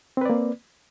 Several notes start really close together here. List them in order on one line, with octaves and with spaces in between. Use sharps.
C4 B4 D5 A#3